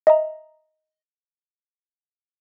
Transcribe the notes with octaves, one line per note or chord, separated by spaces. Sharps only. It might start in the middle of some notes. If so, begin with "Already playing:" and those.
D#5 E5 A#5